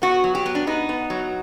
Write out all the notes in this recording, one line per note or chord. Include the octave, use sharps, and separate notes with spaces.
B3 F#4
F#3
G4
B3
D4
B3 D#4
B3
F#3